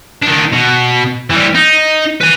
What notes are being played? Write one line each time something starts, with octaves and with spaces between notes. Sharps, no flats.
D#3 D4
B2
E3 G3
D#4
B4 G#5